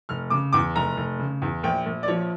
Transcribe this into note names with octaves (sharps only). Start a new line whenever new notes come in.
F1 F6
C#3 D6
E2 D6
F1 A#5
F1
C#3
E2
A#1 G5
A#1
D5
F3 C#5